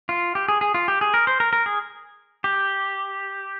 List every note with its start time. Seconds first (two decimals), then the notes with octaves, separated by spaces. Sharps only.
0.09 F4
0.35 G4
0.48 G#4
0.61 G#4
0.74 F4
0.88 G4
1.01 G#4
1.14 A#4
1.27 C5
1.40 A#4
1.53 A#4
1.66 G#4
2.44 G4